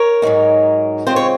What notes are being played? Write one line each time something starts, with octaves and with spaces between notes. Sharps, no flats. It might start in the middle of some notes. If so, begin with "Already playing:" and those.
Already playing: A#4 C#5
G#2 F#3 A#3 D#4
C#3 G#3 C4 F4 C5
C#5